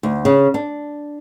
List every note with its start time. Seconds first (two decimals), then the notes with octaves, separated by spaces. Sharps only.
0.03 D2
0.25 C#3
0.54 D4